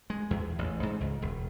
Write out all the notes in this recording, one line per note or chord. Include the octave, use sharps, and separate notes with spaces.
G#3
E2
A1
G#2
C#2
E1